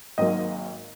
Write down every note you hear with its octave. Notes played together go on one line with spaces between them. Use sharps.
G#1 G#2 F#3 A#3 D#5